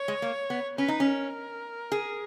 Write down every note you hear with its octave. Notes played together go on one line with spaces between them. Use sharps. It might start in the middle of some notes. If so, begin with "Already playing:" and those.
Already playing: C#5
G#3
A#3
B3
C#4 B4
D#4
C#4
A#4
G#4